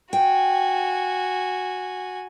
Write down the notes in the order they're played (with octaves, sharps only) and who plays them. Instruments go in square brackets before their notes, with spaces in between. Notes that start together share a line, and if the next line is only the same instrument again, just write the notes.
[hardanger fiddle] F#4 G#5 [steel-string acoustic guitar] G5